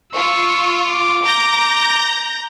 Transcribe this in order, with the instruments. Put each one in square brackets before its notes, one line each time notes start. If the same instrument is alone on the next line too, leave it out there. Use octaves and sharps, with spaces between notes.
[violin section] F4 [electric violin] C#6 E6
[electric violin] D6
[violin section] A#5 G6 A#6